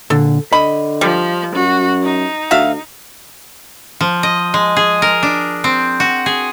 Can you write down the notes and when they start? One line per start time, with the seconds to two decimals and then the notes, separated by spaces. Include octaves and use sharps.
0.10 A#2 D3 A4
0.53 D3 D#5 B5
1.01 F3 G3
1.55 F#2 F#4
2.03 D#4
2.51 D2 F#4 E5 F5
4.01 F3
4.23 D#5
4.54 G#3
4.76 G#4
5.02 A#4
5.23 D4
5.64 C4
6.00 F#4
6.26 G#4